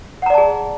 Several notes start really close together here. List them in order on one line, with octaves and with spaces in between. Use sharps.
F#5 A#5 D5 A5 G#4